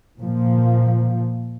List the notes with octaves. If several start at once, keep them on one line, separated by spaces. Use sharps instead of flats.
A#2 F3